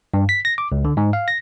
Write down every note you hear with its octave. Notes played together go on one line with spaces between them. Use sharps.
G2
B6
A#6
D6
C#2
D3
G#2
F5
A#6